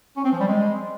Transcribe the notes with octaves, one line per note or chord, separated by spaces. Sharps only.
C#4
C4
F3
G3
G#3